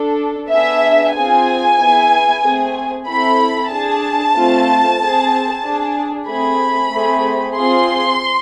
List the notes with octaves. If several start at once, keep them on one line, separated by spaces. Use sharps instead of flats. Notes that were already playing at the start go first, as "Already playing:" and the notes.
Already playing: D4 A4
B3 D4 G#4 E5
C4 F4 G#4 G#5
B3 E4 G#4
A3 C4 G#4
C4 E4 A4 B5
D4 G#4 A5
A3 C4 F4
C4 G#4
D4 G#4
A3 C4 G#4 B5
A3 C4 G#4
C4 F4 G#4 C6